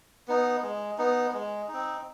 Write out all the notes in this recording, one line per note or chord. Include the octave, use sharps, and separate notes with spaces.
B3 D#4
G#3
B3 D#4
G#3
D#4
C4